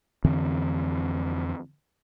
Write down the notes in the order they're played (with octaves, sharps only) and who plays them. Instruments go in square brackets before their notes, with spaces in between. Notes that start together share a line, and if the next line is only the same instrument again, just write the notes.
[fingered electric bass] F2 D3 E3 C4